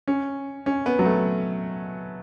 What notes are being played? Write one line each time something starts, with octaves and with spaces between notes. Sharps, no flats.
C#4
C#4
B3
F#3
A3